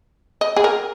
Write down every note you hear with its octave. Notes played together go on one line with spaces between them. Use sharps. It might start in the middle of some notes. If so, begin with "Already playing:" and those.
D#5
G#4
A#4